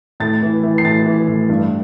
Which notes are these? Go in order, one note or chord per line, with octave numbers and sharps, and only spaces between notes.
A2 A6
E3
E3
C7
A2 A6
E3
A2
G2